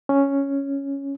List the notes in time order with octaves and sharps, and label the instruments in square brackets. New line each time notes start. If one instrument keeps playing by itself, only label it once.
[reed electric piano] C#4